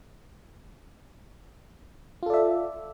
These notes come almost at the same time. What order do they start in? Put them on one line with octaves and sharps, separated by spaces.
F4 A4 D5 E5